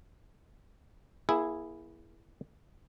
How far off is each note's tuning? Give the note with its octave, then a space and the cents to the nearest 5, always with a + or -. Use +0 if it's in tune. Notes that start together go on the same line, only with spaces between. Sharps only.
A#3 +35 E4 +0 G#4 -5